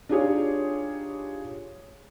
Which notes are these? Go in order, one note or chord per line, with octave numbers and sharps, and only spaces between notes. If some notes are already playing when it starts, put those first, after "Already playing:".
D4 D#4 F4 G4 G#4 C#5